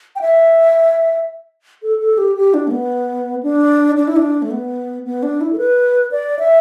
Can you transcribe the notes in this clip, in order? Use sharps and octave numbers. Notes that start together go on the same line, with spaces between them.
G5
E5
A4
A4
G4
G4
D4
A3
B3
D4
D4
E4
D4
A3
B3
B3
D4
E4
A4
B4
D5
E5